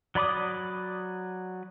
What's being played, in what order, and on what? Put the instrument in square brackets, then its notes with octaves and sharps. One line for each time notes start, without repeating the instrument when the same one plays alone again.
[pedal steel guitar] F#3 D5 B5 D6 D#6